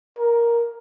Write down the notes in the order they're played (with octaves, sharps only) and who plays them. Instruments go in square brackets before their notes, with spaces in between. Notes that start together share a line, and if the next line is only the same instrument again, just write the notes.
[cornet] A#4